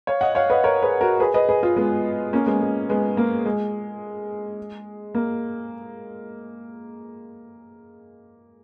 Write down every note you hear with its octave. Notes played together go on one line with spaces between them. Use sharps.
C#5 F5
D#5 F#5
C#5 F5
B4 D#5
A#4 C#5
G#4 B4
F#4 A#4
G#4 B4
B4 D#5
G#4 B4
F4 G#4
G#3 B3
A#3 C#4
G#3 B3
G#3
G#3 B3
A#3
G#3
A#3